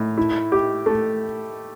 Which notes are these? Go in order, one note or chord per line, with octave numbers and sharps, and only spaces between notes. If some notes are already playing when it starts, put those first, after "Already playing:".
Already playing: A2
E4
G4
A3